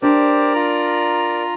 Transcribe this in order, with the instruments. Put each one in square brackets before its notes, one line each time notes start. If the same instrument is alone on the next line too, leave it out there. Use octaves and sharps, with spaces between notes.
[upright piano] D4 [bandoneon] G4 C5 [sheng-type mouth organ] A#4 D5
[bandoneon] F4 A#5